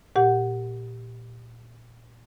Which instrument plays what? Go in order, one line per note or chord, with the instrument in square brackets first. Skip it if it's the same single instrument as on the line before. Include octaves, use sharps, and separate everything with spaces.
[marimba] A#2 G4 F#5